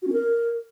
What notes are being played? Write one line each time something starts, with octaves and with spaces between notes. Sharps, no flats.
F#4
C#4
A#4